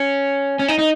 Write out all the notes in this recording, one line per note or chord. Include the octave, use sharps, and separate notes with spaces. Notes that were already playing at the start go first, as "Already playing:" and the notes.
Already playing: C#4
C#4
D#4
D#4